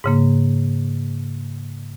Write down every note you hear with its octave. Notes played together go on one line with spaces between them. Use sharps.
G#2 C#3 A#3